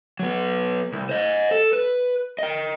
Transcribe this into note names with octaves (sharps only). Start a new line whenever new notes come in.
F#3 B3
C2
C5 D#5
A4
B4
D#5 G5